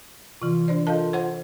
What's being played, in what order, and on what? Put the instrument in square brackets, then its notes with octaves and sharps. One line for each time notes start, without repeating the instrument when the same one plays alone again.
[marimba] C3 E3 [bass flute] F4
[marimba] D4 C5 D5
[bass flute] F4 [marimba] A4 F5 A5 [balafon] A#4 D#5
[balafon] C5 F#5